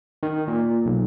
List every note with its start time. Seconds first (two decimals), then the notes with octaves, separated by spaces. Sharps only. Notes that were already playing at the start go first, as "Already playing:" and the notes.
0.23 D#3
0.48 A#2
0.85 B1